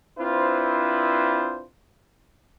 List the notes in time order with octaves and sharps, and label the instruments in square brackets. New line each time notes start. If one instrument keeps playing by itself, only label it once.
[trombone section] C4 D4 E4 F4 B4 C5